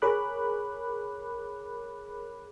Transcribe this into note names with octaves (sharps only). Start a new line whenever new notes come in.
G#4 A#4 C#5 B5 D6 F#6